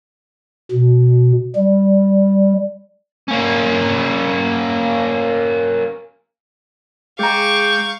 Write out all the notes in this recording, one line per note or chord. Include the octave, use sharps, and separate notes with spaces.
B2
G3
A#3 C#4
G#3 G#4 F5 G5 A#5 C#6 D6 G6